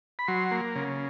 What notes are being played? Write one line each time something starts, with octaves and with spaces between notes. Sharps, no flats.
B5
F#3 C6
A#3
C#3